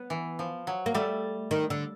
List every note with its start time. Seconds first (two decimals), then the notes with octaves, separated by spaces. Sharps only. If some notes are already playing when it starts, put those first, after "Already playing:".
Already playing: B3
0.10 E3
0.39 F3
0.67 F#3
0.86 A#3
0.94 G3 A3
1.51 D#3
1.70 D3